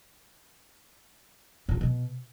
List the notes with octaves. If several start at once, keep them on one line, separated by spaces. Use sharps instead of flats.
A#2
F#3
B2